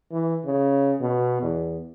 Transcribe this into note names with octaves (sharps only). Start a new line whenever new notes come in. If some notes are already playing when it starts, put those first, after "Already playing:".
E3
C#3
B2
E2